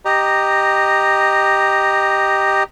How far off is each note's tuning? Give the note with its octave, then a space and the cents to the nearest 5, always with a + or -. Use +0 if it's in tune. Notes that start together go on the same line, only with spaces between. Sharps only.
G4 +0 D#5 -10 A#5 +0